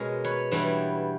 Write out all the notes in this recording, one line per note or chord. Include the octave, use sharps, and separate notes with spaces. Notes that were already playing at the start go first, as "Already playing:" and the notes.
Already playing: B2 G#3 C#4 G#4 A#4
B4 C#5
G2 E3 G3 B3